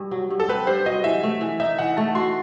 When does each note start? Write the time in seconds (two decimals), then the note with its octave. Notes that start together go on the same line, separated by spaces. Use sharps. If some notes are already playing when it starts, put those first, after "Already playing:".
Already playing: G2
0.11 F#3
0.30 G2
0.40 A4
0.48 C4 B4
0.67 G2 C5
0.86 F#3 D#5
1.04 E3 E5
1.23 A3
1.41 E3
1.60 D#4 E5
1.79 E3 F#5
1.97 A3 A5
2.15 F#4 C6